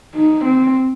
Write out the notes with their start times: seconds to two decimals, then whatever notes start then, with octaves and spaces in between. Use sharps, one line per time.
0.15 D#4
0.45 C4